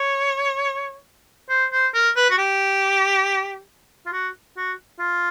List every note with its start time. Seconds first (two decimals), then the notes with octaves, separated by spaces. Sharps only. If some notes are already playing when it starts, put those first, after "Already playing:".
Already playing: C#5
1.49 C5
1.72 C5
1.94 A#4
2.16 B4
2.30 F#4
2.38 G4
4.06 F4
4.12 F#4
4.57 F#4
5.00 F4